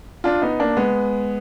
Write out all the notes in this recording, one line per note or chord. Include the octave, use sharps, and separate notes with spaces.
D4 F4
B3 D#4
A#3 D4
G#3 B3